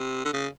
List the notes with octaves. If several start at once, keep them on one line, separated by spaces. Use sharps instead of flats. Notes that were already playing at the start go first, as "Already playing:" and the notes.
Already playing: C3
D3
C#3